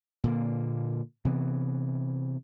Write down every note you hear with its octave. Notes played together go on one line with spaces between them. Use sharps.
A#2 D3 A#3
C3 E3 B3